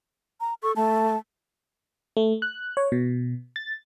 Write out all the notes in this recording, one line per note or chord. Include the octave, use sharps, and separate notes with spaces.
A#5
A4 C#6
A3 A5
A3
F#6
C#5
B2
A6